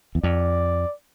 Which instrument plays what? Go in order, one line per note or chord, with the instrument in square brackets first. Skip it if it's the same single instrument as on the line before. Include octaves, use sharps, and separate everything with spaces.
[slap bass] E2
[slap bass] F2 [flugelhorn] D5